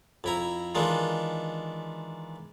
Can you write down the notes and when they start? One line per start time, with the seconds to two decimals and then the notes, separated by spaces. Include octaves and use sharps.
0.24 F2 E4 A#5
0.75 D#3 E3 G#3 D4 F4